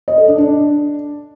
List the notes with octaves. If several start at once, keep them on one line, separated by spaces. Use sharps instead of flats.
D#5
A4
D4
D4